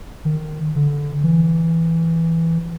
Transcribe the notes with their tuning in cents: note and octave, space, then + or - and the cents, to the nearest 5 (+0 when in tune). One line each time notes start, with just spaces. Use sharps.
D#3 -15
D3 -15
E3 +0